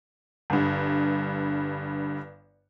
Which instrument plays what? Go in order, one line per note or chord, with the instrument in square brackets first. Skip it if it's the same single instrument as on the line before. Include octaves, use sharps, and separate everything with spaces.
[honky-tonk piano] G1 G2